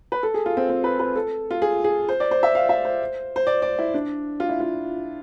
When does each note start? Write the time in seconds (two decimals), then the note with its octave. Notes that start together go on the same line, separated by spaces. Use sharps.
0.12 B4
0.23 A4
0.34 G#4
0.46 F4
0.57 C4
0.69 C4
0.84 B4
0.99 B4
1.16 A4
1.51 F4
1.62 G#4
1.84 G#4
2.09 C5
2.20 D5
2.31 C5
2.43 E5
2.55 F5
2.69 E5
2.85 C5
3.36 C5
3.47 D5
3.62 D5
3.79 E4
3.94 D4
4.40 F4
4.49 E4
4.60 F4